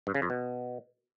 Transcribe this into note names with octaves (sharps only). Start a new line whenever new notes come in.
G2
C#3
F2
B2